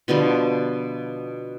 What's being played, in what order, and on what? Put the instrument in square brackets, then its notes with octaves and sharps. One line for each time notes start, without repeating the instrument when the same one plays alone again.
[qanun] B2 D3 F3 G3